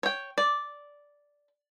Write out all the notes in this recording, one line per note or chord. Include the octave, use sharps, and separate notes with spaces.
C#5 G5
D5